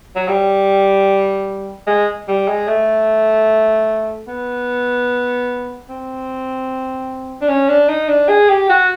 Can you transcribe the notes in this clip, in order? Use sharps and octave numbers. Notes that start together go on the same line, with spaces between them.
F#3
G3
G#3
G3
G#3
A3
B3
C4
D4
C#4
D4
D#4
D4
G#4
G4
F#4